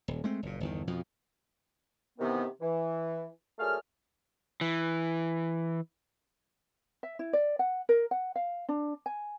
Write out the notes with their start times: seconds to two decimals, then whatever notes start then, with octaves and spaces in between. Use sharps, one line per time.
0.08 D#1
0.24 G#3 A3 C4
0.43 F#1 A#2
0.60 G1 E2 D#3
0.87 F2 B2 F3
2.18 C3 D#3 E3 B3
2.60 E3
3.58 A#2 F#3 A3 G#4 F6
4.61 E3
7.03 E5
7.19 E4
7.33 D5
7.59 F#5
7.89 A#4
8.11 F#5
8.36 F5
8.69 D4
9.06 G#5